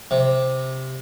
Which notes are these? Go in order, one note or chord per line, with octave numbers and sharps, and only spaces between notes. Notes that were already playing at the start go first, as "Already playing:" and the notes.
C3